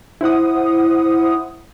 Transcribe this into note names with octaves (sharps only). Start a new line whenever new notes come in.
E4 C5 F#5 D#6